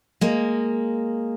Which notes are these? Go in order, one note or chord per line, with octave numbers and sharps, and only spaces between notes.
G#3 A#3